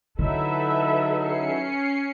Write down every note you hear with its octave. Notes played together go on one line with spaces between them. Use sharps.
D3 F#3 D#4 E4 A4 B4 E5
C#4 C7 C#7